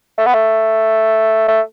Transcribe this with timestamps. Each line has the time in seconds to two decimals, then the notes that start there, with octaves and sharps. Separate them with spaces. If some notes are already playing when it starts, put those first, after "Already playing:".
0.18 A3
0.26 B3
0.34 A3
1.48 A3